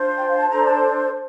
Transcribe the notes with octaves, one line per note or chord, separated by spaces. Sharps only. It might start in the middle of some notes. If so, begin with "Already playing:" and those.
Already playing: D4 F4 C5
G5
F5
A5
D4 A4 C5 A#5
A5